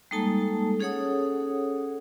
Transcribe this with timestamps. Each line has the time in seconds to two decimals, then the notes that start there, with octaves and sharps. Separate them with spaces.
0.11 G3 G#3 A#3 D#4 A4 A5
0.80 C#4 G#4 A4 C#5 F#5 D#6